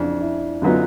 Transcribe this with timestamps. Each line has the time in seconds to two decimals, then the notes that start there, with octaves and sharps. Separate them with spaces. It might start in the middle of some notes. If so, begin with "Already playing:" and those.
Already playing: F2 C#3 E3 D4
0.21 E4
0.62 F#2 D3 F#3 B3 D#4 F4